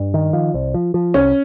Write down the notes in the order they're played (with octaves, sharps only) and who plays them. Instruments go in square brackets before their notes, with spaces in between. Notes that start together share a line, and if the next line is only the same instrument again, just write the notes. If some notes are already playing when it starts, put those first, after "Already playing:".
Already playing: [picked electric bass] G2
D#3
F3
C2
F3
F3
[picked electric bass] C2 [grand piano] C#4